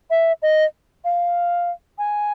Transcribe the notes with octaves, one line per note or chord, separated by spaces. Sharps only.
E5
D#5
F5
G#5